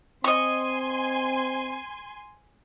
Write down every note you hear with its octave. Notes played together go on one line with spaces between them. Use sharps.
C4 D#5 G#5 C6 C#6